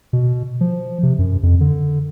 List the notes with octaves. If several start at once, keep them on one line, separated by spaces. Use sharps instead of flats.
B2
F3
C3
F#2
F2
D3